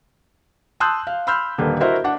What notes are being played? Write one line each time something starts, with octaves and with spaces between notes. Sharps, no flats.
A5 C6 D#6 E6 F#6 G6
F5
B5 C6 E6 F6 G6
D#1 D3 A#3 A4 B4
E4 F#4 A#4 C5 D#5 E5
D4 F#5